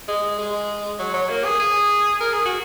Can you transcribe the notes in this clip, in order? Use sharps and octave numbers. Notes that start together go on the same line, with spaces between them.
G#3
G#3
F#3
F#3
A#3
G#4
G#4
A#4
G#4
F#4